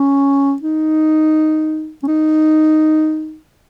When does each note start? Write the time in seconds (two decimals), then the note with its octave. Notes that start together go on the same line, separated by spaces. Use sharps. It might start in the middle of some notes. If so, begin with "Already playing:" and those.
Already playing: C#4
0.62 D#4
2.03 C#4
2.07 D#4